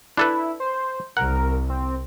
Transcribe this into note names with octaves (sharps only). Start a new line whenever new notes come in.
D4 E4 A4 B4
C5
C2 A#4 F#5
C4